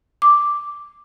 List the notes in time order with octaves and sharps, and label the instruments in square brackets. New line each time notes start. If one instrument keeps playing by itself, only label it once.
[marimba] D6